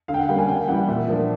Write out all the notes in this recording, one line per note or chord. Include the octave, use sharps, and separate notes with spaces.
D3 F5
G5
F#5
G3 A#3 C#4 G5
G#5
C#3 G5
E3 G3 F#5
A#2 E5
F3 A#3 D4